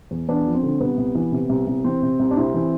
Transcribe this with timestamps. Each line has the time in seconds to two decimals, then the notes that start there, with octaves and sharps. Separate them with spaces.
0.11 E2
0.29 E2 B3 D4
0.46 F3
0.54 C4
0.63 D3
0.80 C2 B3
0.98 C2
1.15 E3
1.32 C3
1.49 C2
1.67 C2
1.84 E3 C4
2.02 C3
2.19 C2
2.31 D4
2.37 C2 C4 E4
2.54 E3